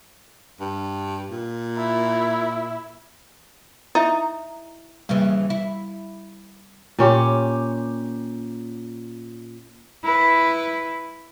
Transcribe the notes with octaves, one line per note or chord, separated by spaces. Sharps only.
G2
A#2
E4
D#4 E4 E5
D#2 C#3 E3 G3
E4
A#2 C#4 G4
E4 B4